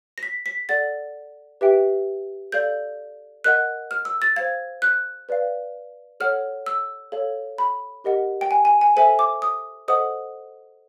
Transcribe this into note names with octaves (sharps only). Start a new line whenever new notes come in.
A#6
B6
B6
A4 D5 F#5 A6
G4 B4 E5 G5
A4 D5 F5 G6
A#4 D#5 F#5 F#6
F6
E6
A6
C5 F5 G#6
F#6
B4 D5 F5
A4 C#5 F#5 F6
E6
A4 C#5 F5
B5
G4 A#4 D#5 F#5
G5
G#5
G#5
G#5
A4 C5 E5 G#5
D6
D#6
A4 C5 D#5 F#5 D#6